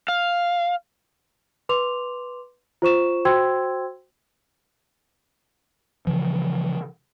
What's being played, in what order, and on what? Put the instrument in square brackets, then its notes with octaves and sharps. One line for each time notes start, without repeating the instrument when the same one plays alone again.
[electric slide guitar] F5
[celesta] B4 C6 D6 F7
F4 C5 C#6 E7
F#4 C5 G5 C6 E6 G#6
[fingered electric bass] C#3 E3 F3